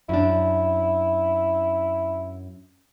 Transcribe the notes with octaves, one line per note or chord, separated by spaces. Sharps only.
F#2 D4 E4